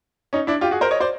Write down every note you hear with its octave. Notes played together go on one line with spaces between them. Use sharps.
C#4 D#4
D4 E4
F4 G4
F#4 G#4
A#4 C5
C#5 D#5
C5 D5